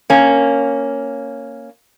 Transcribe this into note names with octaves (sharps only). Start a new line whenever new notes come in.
A#3 C#4